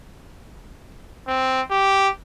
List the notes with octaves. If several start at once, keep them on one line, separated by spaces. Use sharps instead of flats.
C4
G4